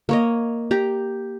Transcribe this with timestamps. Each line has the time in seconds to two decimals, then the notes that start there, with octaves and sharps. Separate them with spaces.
0.09 A#3 C#5 D#5
0.71 G4 A#5